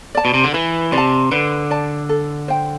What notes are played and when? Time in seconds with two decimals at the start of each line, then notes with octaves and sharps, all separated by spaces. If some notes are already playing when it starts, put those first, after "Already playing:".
0.15 D5 A5
0.25 B2
0.34 C3
0.44 D3
0.54 E3 B4
0.92 C3 D5
0.97 A5
1.31 D3 B4
1.71 D5 A5
2.09 A4
2.48 C5 G5